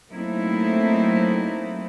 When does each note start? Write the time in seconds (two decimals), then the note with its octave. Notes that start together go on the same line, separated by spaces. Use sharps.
0.12 F#3 A3 A#3 C4 D#4 E4